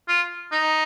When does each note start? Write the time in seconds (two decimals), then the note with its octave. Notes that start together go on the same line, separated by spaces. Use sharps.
0.08 F4
0.52 D#4